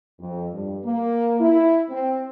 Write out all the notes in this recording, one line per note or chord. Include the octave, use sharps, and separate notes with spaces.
F2
G2
A#3
E4
C4